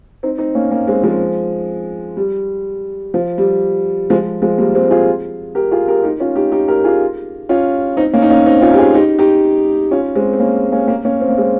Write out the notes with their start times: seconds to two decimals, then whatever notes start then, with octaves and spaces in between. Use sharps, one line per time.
0.23 C4 D#4
0.38 C4 D#4
0.55 A#3 C#4
0.71 A#3 C#4
0.87 G#3 C4
1.03 F3 G#3
2.17 G3
3.14 F3
3.38 G3
4.10 F3 G#3
4.42 F3 G#3
4.58 G3 A#3
4.75 G#3 C4
4.91 F4 G#4
5.55 G4 A#4
5.71 F4 G#4
5.88 G4 A#4
6.04 D#4 G4
6.20 C#4 F4
6.36 D#4 G4
6.52 D#4 G4
6.68 G4 A#4
6.84 F4 G#4
7.49 C#4 F4
7.97 C4 D#4
8.14 A#3 C#4
8.22 D#4
8.30 A#3 C#4
8.46 C4 D#4
8.62 C#4 F4
8.73 G4
8.78 F4 G#4
8.94 D#4 G4
9.19 D#4 G4
9.91 C#4 F4
10.15 G#3 C4
10.33 C4
10.40 A#3 C#4
10.72 A#3 C#4
10.88 A#3 C#4
11.05 A#3 C#4
11.21 C4
11.29 A#3
11.38 G#3 C4